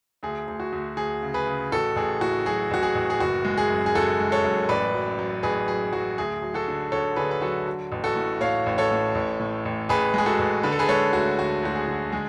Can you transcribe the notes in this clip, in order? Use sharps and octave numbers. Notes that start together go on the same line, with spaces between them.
D2 G#4
D2
F#4
D2
D2 G#4
C#3
G#4 B4
C#3
A1 F#4 A4
A1 G#4
A2 F#4
F#3 G#4
A1 F#4
G#4
A1
G#4
F#1 F#4
G#3
G#4
F#2
G#4
F#2 F#4 A4
G#3
A4 C#5
F#2
A1 B4 D5
F#3
F#3
A1 G#4 B4
F#3 G#4
F#3 F#4
D2 G#4
F#3
F#4 A4
D3
D3 A4 C#5
D3 G#4 B4
B4
F#3 F#4 A4
F#3
A1
F#4 A4
A2
A2 C#5 F5
A1
A4 C#5
A2
A1
A2
A1
A1 G#4 B4
G#3 G#4
F#4 A4
A1
D3 B4
A4
G#4 B4
G#3 A4 C#5
D2 F#4 A4
D2 F#4
D2 F#4
G#4
D3
G#3 G#4